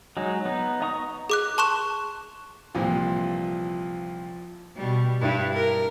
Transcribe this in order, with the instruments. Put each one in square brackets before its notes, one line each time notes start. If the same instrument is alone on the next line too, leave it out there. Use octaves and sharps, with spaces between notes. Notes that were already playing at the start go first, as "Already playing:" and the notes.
[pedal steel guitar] F#3 G#3 D#4
B3 D#4
D#5 A#5 C#6 D#6
[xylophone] G#4 D6 F#6
A5 C6 C#6 F#6 E7
[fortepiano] C2 A#2 E3 [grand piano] F3
[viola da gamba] B2 G3
G2 E4 B4
A#4